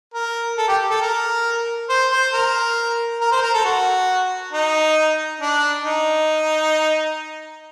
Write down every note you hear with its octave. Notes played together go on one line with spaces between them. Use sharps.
A#4
A4
G4
A4
A#4
C5
C5
A#4
A#4
C5
A#4
A4
F#4
D#4
D4
D#4